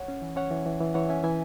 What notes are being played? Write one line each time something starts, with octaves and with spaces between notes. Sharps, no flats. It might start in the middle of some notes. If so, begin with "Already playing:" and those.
Already playing: C#5 F#5
C#4
E3
C#4 C#5 F#5
E3
E3
E3
E3 C#5 F#5
C#4 E5 G#5
E3 E5 G#5